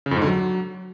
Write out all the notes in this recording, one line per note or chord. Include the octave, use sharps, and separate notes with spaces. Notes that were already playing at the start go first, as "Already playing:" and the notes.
C#3
F2
G#2
D3
F#3